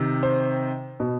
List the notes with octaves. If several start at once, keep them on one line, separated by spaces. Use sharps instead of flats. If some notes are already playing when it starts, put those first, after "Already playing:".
Already playing: C3 D#3
C5
B2